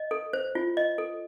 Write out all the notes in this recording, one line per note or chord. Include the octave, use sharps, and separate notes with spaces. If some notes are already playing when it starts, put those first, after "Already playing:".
Already playing: D#5
A4
C5
F4
D#5
A4